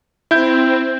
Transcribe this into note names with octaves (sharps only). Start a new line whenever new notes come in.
C4 E4 G6